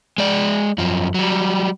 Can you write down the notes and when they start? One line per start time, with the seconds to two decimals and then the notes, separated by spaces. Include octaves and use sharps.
0.18 G#3 D5
0.78 F#2 F3
1.14 F#3 G3